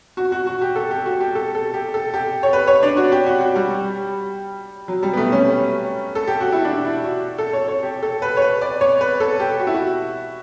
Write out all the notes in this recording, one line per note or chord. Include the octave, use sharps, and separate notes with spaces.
F#4
F#4
F#4
G4
A4
G4
F#4
G4
A4
A4
G4
A4
G4
C#5
B4
C#5
D4
F#4
G4
F#4
F#4
G3
F#3
G3
B3
A3
C#4
A4
G4
F#4
E4
D4
E4
F#4
A4
C#5
C#5
G4
A4
B4
C#5
B4
D5
C#5
B4
A4
G4
F#4
E4
F#4